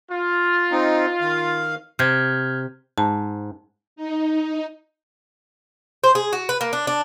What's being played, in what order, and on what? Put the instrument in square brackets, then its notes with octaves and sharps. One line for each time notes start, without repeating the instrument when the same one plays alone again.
[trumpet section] F4
[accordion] C4 D#4
D#3 F5
[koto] C3 [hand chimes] F6 G6 G#6
[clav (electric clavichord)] G#2 [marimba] A5
[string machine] D#4
[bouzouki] C5
G#4
F#4
B4
A#3
D4
D4